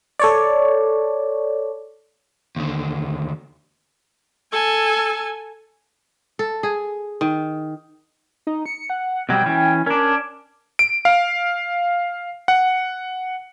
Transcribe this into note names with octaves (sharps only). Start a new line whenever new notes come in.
A4 C#5 D5
D#2 D3
A4 G#5
A4
G#4
D#3
D#4
C#7
F#5
B2 F#3 G3 G5
E3 C#4
C#4 D4 A#4
D7
F5
F#5